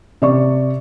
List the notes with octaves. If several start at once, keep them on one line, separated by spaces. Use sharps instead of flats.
C3 D5 C#6